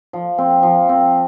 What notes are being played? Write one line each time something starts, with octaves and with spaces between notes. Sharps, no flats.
F3
C4
F3
C4